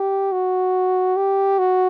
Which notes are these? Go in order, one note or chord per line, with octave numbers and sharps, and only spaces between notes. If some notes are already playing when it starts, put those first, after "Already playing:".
Already playing: G4
F#4
G4
F#4